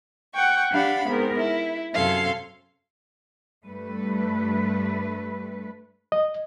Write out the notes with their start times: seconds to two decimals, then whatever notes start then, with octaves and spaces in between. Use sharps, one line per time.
0.33 F#5 G5 C#6
0.72 D4 G4 F5 F#5 B5
1.08 G#2 B3 C4 A#4
1.38 E4
1.94 F#2 C3 C#4 A4 F5 C6
3.66 G2 A3 B4
6.12 D#5